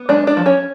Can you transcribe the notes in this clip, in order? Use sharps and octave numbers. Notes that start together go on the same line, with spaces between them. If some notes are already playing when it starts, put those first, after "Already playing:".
Already playing: B3
G#3 D4 D5
D4 D5
F3
C#4 C#5